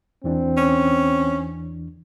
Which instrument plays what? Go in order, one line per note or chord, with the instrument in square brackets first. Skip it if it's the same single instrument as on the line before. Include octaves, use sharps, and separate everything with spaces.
[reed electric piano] E2 E3 D4 [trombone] C4
[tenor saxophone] C#4